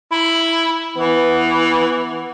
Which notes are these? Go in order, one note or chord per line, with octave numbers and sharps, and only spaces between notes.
E4
E3 B3